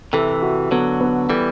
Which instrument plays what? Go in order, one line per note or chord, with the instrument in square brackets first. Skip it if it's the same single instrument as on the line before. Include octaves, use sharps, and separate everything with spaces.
[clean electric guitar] C3 E3 [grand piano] A4
[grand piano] F#4
[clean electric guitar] D3 F#3 [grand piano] B3
[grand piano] B3
[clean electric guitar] E3 G3 [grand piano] A4